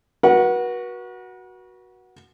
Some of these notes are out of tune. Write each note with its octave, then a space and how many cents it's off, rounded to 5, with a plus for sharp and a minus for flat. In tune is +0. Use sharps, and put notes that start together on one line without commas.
F#4 +0 B4 -40 F#5 +0